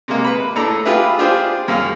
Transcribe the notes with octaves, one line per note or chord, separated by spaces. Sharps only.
C3 G#3 A#3
B4 B5
A2 D4 A4 A#5
F4 G4 G#4 B4 E5
D4 F4 G4 G#4 C5
F#2 G#4 F5 F6